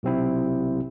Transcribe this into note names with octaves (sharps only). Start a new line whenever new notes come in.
B1 C3 C4 E4